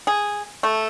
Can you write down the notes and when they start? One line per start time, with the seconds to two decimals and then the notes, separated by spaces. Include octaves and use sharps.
0.07 G#4
0.63 A3